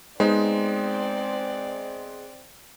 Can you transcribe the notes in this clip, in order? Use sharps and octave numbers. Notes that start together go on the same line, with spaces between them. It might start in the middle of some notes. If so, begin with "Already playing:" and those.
G#3 B3 C4 D#4 C5 D5